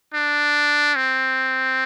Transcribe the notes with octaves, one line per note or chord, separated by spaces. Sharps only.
D4
C4